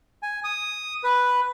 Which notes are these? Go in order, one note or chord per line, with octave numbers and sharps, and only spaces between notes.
G#5
D#6
B4